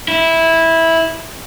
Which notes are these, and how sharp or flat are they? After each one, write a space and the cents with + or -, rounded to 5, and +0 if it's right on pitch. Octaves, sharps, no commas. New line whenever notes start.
E4 -10